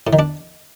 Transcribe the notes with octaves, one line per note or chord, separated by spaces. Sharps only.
A2
D#3
D4